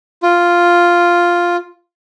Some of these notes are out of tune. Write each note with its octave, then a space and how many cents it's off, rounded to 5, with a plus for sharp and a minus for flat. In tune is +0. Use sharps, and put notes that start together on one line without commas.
F4 +0